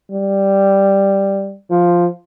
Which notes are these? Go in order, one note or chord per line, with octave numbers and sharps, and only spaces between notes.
G3
F3